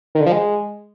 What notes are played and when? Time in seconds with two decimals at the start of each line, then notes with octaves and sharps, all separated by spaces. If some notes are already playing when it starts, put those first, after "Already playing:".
0.15 D#3
0.21 D3
0.26 F3
0.32 G#3